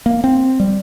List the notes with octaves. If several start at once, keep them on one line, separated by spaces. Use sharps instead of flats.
A#3
C4
G3